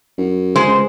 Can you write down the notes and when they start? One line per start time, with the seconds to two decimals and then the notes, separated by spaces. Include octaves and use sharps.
0.18 F#2
0.56 G#3 C5
0.67 C#2